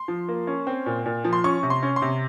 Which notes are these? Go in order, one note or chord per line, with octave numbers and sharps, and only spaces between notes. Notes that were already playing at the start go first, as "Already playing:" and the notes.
Already playing: C6
F3
A#3
C#4
C4
A#2
A#2
F3
C6
C#4 C#6
C3
C6
C#4
C6
C3